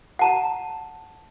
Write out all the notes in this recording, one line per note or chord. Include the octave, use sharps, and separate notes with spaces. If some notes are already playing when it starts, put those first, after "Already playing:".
F#5 A5 A#5